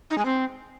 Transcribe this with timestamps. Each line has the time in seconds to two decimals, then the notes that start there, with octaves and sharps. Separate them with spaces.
0.10 D#4
0.18 G#3
0.25 C4